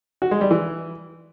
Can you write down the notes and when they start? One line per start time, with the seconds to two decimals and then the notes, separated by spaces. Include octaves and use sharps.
0.22 F#4
0.31 G#3
0.41 G3
0.51 E3